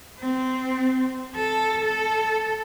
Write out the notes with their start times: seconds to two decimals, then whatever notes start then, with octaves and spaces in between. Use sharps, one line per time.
0.19 C4
1.35 A4
1.85 A4